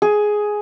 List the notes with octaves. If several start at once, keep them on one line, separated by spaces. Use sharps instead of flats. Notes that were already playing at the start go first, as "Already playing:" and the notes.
G#4